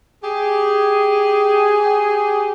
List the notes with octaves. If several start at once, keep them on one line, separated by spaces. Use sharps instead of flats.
G4 G#4